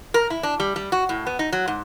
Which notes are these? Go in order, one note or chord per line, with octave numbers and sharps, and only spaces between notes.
A#4
E4
D4
G3
G3
F#4
A2
B3
D#4
F#3
G#2